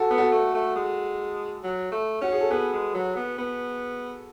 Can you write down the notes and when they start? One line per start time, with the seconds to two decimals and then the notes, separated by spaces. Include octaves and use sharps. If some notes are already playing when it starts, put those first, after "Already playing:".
Already playing: F#4 A4
0.11 B3
0.18 F#4 A4
0.32 A3
0.55 A3
0.76 G#3
1.64 F#3
1.92 A3
2.21 C#4 F#4
2.32 G#4
2.40 A4
2.51 B3 G#4 B4
2.73 G#3
2.94 F#3
3.16 B3
3.38 B3